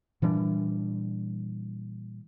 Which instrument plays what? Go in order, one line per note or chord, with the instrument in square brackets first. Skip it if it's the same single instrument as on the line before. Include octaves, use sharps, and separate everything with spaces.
[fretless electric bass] A#2 E3 G3 D4